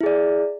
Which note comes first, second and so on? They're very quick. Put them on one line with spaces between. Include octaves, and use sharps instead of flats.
E4 G#4 D5